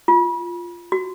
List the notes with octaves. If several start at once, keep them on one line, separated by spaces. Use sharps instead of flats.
F4
F#4